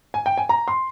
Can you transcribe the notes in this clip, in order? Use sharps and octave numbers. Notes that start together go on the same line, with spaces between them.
G#5
G5
G#5
A#5
C6